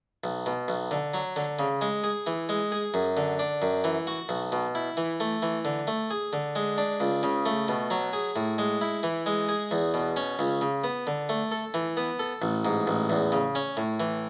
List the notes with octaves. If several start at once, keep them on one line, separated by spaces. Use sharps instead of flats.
B1
B2
B1
D3
F#3
D3
C#3
G#3
G#4
E3
G#3
G#4
F#2
D3
D4
F#2
E3
F#4
B1
B2
E4
E3
A3
E3
D3
A3
G#4
D3
G#3
D4
C#2
C#3
A3
B2
F#3
G#4
A2
G#3
E4
E3
G#3
G#4
E2
B2
C#4
C#2
C#3
B3
D3
A3
A4
E3
B3
A4
A1
G#2
A1
E2
C#3
C#4
A2
E3